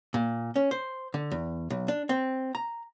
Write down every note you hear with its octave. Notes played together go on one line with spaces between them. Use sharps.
A#2
C#4
C5
D3
E2
B1
D4
C4
A#5